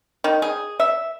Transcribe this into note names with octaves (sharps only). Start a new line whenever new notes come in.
D#3
G#4
E5